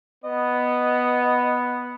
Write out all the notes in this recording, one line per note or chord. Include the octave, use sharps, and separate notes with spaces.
B3 D#5